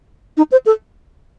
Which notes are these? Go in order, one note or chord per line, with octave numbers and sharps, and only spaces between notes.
D#4
C5
A4